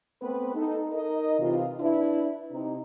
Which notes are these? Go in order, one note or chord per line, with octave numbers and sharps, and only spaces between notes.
A3 B3 C4 B4
D#4 A4
D#4 A#4 D#5
C3 E3 F4
D4 E4 B4
C3 D#4